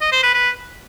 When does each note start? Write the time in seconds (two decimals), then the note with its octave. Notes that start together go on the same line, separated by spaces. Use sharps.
0.01 D#5
0.12 C5
0.23 B4
0.34 B4